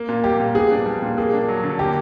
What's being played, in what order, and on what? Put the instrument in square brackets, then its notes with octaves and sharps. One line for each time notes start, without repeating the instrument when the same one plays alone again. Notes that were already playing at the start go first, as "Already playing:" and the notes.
Already playing: [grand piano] A#3
A#2
[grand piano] G3 [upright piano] G4
[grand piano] A#2
[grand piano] B3 [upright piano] G#4
[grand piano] D4
G3
A#2
[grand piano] A#3 [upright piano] G#4
[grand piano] D4
F#3
D3
[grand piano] A#3 [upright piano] G4